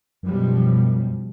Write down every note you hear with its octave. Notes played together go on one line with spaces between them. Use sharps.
F#2 B2 F3 G3